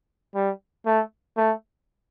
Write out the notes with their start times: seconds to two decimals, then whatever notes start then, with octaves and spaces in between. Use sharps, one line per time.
0.35 G3
0.86 A3
1.37 A3